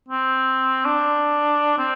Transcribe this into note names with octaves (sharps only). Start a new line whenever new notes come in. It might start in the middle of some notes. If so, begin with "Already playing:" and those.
C4
D4
C4